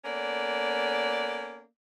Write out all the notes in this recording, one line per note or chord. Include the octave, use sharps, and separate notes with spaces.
A#3 B3 C#4 A4 D5